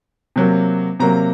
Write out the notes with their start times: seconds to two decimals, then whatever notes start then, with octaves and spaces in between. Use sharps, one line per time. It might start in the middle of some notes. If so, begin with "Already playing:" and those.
0.36 C3 F#3 A#3
1.00 C3 F#3 A#3 A#5